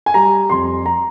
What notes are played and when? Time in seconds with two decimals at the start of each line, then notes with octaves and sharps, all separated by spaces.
0.06 G#5
0.14 G3 A#5
0.50 F2 C6
0.86 A#5